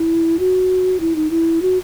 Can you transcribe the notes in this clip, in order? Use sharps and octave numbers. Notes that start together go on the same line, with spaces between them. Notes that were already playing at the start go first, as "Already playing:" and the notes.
Already playing: E4
F#4
E4
D#4
E4
F#4